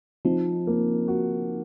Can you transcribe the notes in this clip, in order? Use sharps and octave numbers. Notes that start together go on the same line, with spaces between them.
F3 C4 D#4
A#3
F#4